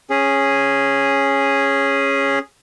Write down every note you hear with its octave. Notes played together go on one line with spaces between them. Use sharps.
C#4 G#4